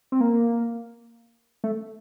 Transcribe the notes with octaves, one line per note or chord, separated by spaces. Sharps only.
C4
A#3
A3